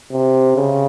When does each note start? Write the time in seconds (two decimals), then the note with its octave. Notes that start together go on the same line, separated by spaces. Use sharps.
0.12 C3
0.56 C#3